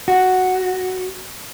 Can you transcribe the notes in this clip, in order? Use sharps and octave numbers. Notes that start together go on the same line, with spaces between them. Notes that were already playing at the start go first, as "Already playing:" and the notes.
F#4